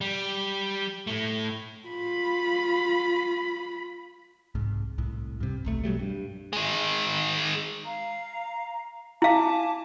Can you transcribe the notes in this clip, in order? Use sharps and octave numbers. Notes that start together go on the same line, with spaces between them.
G3
A2 A3
F4 B5
C2 G#2
C2 A2
G2 C3
D1 B1 A3
B2 F#3 G3 A3
G2
D#3 G#3
F5 A#5
E4 F5 G#5 A5 D6